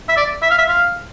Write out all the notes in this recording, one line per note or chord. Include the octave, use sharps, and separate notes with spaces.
E5
D5
E5
F5
E5
F5